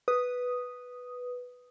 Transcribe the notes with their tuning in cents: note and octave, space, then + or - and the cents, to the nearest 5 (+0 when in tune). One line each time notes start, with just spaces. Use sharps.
B4 +0 D#6 +0